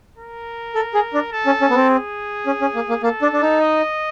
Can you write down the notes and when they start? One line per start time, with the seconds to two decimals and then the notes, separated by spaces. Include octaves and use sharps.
0.18 A#4
0.75 A4
0.94 G#4
1.14 D4
1.32 A4
1.46 C#4
1.61 C#4
1.70 B3
1.75 C4
1.89 G#4
2.46 C#4
2.61 C#4
2.75 A#3
2.89 A#3
3.03 A#3 A4
3.22 D4
3.33 D4
3.42 D#4
3.61 D#5